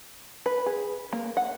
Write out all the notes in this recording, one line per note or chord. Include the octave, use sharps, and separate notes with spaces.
B4
G#4
A#3
F#5